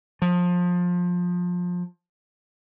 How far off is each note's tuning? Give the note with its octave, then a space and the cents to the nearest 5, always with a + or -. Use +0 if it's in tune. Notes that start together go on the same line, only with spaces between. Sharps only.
F3 +25